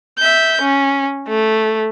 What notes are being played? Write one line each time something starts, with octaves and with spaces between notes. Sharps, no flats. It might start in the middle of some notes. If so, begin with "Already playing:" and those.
E5 G6
C#4
A3